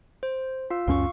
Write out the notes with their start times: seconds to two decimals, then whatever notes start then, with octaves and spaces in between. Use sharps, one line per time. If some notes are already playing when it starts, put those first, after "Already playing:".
0.23 C5
0.70 F4 F5 E6
0.88 C#2 F#2 C#4 F5 C#6